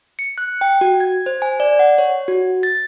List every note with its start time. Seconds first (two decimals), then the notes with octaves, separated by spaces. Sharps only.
0.19 C#7
0.38 F#6
0.61 G5
0.81 F#4
1.00 G#6
1.26 C5
1.42 G#5
1.60 D5
1.79 F#5
1.98 C#5
2.28 F#4
2.63 A6